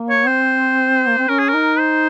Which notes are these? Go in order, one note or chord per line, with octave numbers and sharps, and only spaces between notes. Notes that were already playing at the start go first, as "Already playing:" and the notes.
Already playing: A#3
C#5
C4 C5
A#3
C4
C#4 A#4
G#4
D#4 A#4
C5